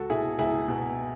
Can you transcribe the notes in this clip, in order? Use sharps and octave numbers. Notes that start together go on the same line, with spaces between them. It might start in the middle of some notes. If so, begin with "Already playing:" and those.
Already playing: C#2 F#4 A4
B2 E4 G#4
C#2 E4 G#4
B2